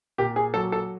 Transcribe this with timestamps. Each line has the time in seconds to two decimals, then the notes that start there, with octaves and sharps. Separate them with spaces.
0.18 A#2 G4
0.36 G#4
0.54 F#3 A4
0.72 A4